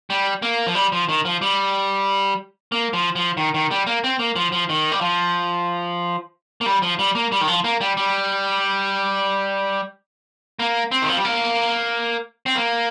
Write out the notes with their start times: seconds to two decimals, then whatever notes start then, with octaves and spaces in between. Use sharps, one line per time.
0.10 G3
0.42 A#3
0.67 F3
0.75 G3
0.92 F3
1.09 D#3
1.25 F3
1.41 G3
2.72 A#3
2.93 F3
3.15 F3
3.37 D#3
3.54 D#3
3.71 G3
3.87 A#3
4.04 C4
4.19 A#3
4.36 F3
4.52 F3
4.69 D#3
4.92 G3
5.01 F3
6.61 A#3
6.66 G3
6.82 F3
6.99 G3
7.15 A#3
7.32 G3
7.41 D#3
7.48 F3
7.64 A#3
7.81 G3
7.97 G3
10.59 A#3
10.91 C4
11.02 D#3
11.09 F3
11.17 G3
11.25 A#3
12.46 C4
12.55 A#3